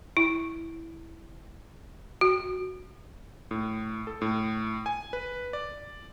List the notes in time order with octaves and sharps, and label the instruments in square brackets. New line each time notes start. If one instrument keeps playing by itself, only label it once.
[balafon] E4
F#4
[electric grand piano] A2
A4
A2
G#5
B4
D5